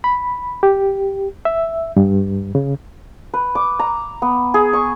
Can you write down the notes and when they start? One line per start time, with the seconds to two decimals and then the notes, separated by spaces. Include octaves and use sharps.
0.04 B5
0.63 G4
1.45 E5
1.97 G2
2.55 C#3
3.34 B4
3.55 D6
3.79 A#5
4.22 B3
4.54 G#4
4.73 C#6